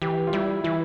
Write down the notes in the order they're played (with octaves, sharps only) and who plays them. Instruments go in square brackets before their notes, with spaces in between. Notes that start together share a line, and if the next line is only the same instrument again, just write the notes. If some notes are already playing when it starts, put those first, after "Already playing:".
[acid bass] E3 [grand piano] G4
[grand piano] F4
[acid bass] G3 [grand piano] E4
[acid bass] E3 [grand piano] E4